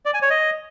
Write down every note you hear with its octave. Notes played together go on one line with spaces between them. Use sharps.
D5
G#5
C#5
D#5